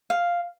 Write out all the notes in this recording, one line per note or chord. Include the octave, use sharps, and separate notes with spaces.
F5